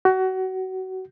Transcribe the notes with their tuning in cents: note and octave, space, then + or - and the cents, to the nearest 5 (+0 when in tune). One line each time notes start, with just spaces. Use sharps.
F#4 +25